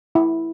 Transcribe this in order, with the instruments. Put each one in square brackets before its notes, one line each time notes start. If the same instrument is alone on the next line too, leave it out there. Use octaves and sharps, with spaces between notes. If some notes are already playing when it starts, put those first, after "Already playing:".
[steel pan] E4